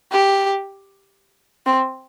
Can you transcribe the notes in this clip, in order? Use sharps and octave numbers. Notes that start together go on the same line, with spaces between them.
G4
C4